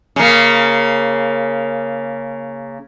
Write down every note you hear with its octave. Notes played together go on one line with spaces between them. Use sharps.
C#3 A#3